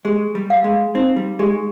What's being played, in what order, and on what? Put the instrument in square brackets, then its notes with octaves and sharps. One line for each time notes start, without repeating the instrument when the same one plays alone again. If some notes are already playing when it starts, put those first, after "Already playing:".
[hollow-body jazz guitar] G#3 [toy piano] G4
[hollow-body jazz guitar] G3
[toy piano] F5
[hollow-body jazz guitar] G#3
[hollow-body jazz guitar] C4 [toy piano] D#4
[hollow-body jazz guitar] G3
[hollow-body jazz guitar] G#3 [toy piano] G4